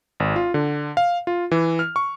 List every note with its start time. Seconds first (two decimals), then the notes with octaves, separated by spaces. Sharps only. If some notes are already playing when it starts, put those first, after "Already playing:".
0.20 G#1
0.36 F4
0.54 D3
0.97 F5
1.27 F4
1.51 E3
1.79 F6
1.96 C#6